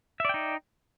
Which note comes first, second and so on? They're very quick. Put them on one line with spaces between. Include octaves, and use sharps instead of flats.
E5 D5 G5 D#4